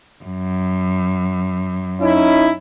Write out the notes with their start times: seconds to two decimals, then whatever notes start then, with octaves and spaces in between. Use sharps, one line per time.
0.24 F#2
2.01 C#4 D#4 E4